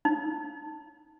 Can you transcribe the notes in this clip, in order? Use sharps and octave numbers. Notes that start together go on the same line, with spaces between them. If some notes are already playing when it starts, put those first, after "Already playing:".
D#4